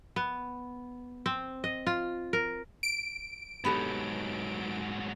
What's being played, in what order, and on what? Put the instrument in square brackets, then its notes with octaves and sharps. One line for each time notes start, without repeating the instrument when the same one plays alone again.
[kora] B3
C4
D#5
F4
A#4
[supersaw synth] D7
[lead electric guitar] G#2 F#3 [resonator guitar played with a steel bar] B3 G4 A4